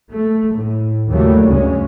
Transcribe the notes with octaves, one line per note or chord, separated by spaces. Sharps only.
A3
A2
D#2 A2 C#3 F#3 G3 A3
D2 G2 C#3 G#3 C#4